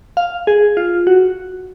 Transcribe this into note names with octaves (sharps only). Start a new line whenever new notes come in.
F5
G#4
F4
F#4